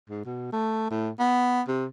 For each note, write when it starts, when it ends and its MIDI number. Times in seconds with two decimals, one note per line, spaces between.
0.09 0.22 44
0.25 0.47 47
0.52 0.87 57
0.90 1.09 45
1.19 1.61 59
1.68 1.86 48